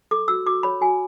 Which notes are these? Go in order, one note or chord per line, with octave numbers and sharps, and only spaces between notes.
A4 D6
F#4 E6
F#4 D6
C#5 B5
F#4 G#5